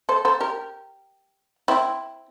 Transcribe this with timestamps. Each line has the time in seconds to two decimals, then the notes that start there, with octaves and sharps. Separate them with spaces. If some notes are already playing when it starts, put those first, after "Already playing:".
0.09 A4 C5
0.25 A4 C5
0.40 G4 A#4
1.68 C4 E4